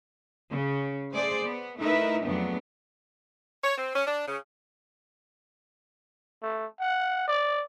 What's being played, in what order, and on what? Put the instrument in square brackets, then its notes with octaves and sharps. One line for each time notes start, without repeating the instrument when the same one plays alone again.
[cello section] C#3
A3 G#4 C5 D5
B3
A3 D#4 E4 A#4 B4 E5
F2 C#3 F#3 A3 B3 D4
[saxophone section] C#5
C4
C#4
D4
C#3
[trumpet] A3
F#5
D5